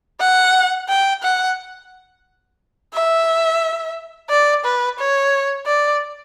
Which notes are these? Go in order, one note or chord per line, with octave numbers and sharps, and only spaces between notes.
F#5
G5
F#5
E5
D5
B4
C#5
D5